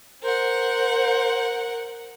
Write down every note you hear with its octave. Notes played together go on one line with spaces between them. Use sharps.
A#4 C5 F#5